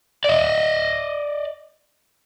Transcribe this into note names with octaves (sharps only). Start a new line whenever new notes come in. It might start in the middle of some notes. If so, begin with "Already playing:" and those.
D5 D#5